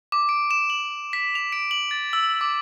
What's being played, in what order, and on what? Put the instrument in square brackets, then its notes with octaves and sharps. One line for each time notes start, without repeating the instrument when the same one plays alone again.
[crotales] D6
D7
E7
F#7
B6
F7
D7
F#7
A6
E6
D6